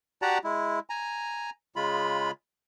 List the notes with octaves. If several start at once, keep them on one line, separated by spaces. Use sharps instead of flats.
F#4 G4 D5 F#5 A5 A#5
G#3 E4
G#5 A#5
C#3 G#3 F4 B5